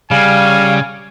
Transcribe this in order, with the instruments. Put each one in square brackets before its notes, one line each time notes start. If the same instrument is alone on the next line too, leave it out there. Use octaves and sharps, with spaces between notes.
[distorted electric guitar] C#3 [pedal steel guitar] G3 [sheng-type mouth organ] F5 [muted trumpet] G#5